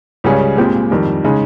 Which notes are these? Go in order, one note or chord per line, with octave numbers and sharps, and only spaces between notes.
C#2 C#3 G3 C#4 G#4
A#2 G#3 C4 G4
F2 D#3 G3
C#3 G#3 D#4